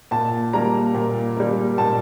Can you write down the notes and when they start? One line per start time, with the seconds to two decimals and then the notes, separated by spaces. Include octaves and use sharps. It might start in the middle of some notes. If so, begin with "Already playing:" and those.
0.11 A#2 A5
0.53 G3 A#3 A#5
0.95 A#2
1.37 G3 A#3
1.78 A#2 A5